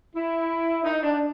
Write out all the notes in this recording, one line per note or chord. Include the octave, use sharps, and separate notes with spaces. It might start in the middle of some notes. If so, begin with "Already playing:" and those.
E4
D#4
D4